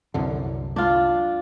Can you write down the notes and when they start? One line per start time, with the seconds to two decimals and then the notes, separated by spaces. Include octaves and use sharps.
0.14 C2 F#2 D3
0.76 D4 F4